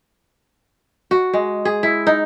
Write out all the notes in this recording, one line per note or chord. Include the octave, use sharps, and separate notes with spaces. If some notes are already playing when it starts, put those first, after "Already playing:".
F#4
G#3
G#4
E4
D#4